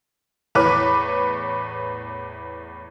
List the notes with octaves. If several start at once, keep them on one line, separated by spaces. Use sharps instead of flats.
E2 A2 B4 C#5 D6 F#6